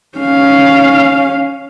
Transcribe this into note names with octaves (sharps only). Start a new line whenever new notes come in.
C#4 F5